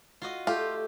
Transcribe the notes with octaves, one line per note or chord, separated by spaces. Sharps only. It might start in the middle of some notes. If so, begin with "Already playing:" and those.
F4 F#4 D#5
A3 F4 G4